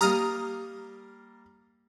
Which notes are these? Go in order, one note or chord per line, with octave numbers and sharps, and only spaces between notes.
G3 A#3 A#5 D#6 F6